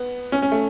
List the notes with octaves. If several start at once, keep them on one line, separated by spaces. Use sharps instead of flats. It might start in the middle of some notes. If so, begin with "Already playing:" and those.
Already playing: B3
C#4
C#4
A3